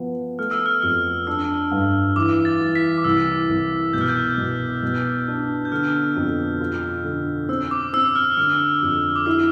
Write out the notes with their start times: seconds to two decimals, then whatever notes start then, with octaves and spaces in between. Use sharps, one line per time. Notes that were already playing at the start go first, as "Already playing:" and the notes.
Already playing: F3 B3
0.38 A3 F6
0.51 E6
0.66 F6
0.83 F2 F6
1.27 D4 E6
1.71 G2
2.16 E3 D6
2.45 A6
2.60 E3
2.75 B6
2.98 D6
3.04 C2 E6
3.49 C2
3.93 B2 G6
4.01 F6
4.09 G6
4.38 B2
4.83 B2
5.27 D4
5.65 G6
5.72 D3 F6
6.16 F2
6.60 F4
7.04 D3
7.49 C4 E6
7.71 D6
7.93 C4 E6
8.16 F6
8.37 D3 F6
8.83 F2
9.16 D6
9.26 E4 E6